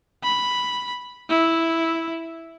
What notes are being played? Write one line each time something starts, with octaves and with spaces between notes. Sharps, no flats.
B5
E4